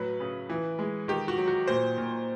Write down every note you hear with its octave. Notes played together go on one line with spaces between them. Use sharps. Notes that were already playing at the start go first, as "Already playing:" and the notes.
Already playing: A2 F#3 B4
C#3
E3
G#3
D#3 G4
F#4
F#3
F#4
A#2 C5
A#2